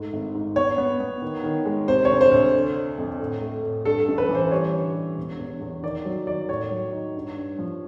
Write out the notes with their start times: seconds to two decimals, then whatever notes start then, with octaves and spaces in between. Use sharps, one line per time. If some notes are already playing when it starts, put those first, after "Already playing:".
Already playing: G#2 A3
0.13 G#1
0.35 G#2
0.56 B3 C#5
0.78 B3
1.00 B3
1.22 D#3
1.43 D#3
1.65 G#3
1.88 C3 C5
2.05 D2 C#5
2.21 C5
2.31 D2
2.54 D3
2.76 D3
2.98 F2
3.19 A2
3.41 A3
3.63 A2
3.85 G2 A4
4.08 A1
4.18 B4
4.29 E3
4.35 C5
4.51 G3 C#5
4.73 D3
4.95 G3
5.17 E1
5.39 E2
5.61 E2
5.83 D#3 D5
6.05 F#3
6.27 D#3 D5
6.49 A2 C#5
6.71 F#3
6.92 D#4
7.15 G2
7.37 G2
7.59 F3